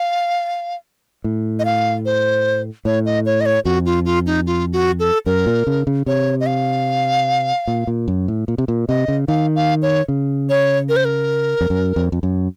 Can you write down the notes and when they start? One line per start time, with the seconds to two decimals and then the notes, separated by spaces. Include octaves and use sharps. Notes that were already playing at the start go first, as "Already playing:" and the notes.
Already playing: F5
1.24 A2
1.59 D#5
1.65 F5
2.05 C5
2.85 A2 C#5
3.06 D#5
3.26 C#5
3.41 D#5
3.46 C#5
3.65 F2 F#4
3.86 F4
4.05 F4
4.26 D#4
4.46 F4
4.73 F#4
4.99 A4
5.26 F#2 A#4
5.46 A#2
5.67 C#3
5.87 C#3
6.06 C3 C#5
6.40 D#5
6.46 F5
7.67 A#2
7.87 A#2
8.08 F#2
8.28 A2
8.48 A#2
8.58 C3
8.68 A#2
8.89 C3 D#5
9.08 C#3
9.28 D#3 F5
9.56 F5
9.82 C#5
10.08 C#3
10.49 C#5
10.89 A#4
10.96 C5
11.05 A#4
11.61 F2
11.70 F#2
11.96 F2
12.12 F2
12.23 F#2